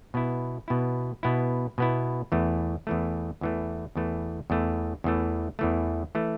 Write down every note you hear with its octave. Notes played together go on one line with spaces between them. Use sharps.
B2 B3 E4
B2 B3 E4
B2 B3 E4
B2 B3 E4
E2 E3 A3
E2 E3 A3
E2 E3 A3
E2 E3 A3
E2 E3 A3
E2 E3 A3
E2 E3 A3
E3 A3